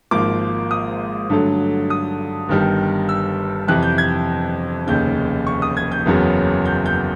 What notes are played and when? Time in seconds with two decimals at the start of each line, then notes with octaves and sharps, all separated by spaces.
0.11 G#1 G#2 F3 A#3 D6
0.71 D#6
1.30 G2 D3 F#3 A3
1.90 D#6
2.49 G1 G2 D#3 G3
3.09 E6
3.68 F2 C3 E3 F#6
3.83 G6
3.98 G#6
4.87 F1 D#2 C#3 G6
5.47 C#6
5.62 D#6
5.77 G#6
5.92 G6
6.06 F#1 E2 C#3 F#3 B3
6.66 G6
6.86 G6